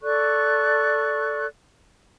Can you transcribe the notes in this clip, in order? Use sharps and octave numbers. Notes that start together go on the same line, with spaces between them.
A4 D5 C#6 F#6